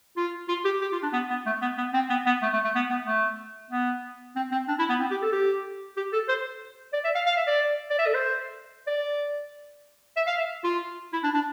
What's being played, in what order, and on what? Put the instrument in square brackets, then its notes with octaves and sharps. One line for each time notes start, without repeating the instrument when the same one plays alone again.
[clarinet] F4
F4
G4
G4
F4
D4
B3
B3
A3
B3
B3
C4
B3
B3
A3
A3
A3
B3
B3
A3
B3
C4
C4
D4
E4
B3
C4
G4
A4
G4
G4
A4
C5
D5
E5
F5
F5
E5
D5
D5
E5
A4
C5
D5
E5
F5
E5
F4
E4
D4
D4